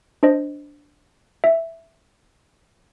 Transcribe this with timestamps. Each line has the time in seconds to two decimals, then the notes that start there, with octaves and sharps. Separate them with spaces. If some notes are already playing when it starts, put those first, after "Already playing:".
0.23 D4 C5 D#5
1.44 E5